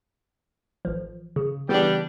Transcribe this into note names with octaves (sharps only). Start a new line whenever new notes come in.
A1 F3
C#3
C#3 E3 G3 B3 D4 G4